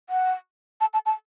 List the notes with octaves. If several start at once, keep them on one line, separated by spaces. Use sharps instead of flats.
F#5
A5
A5
A5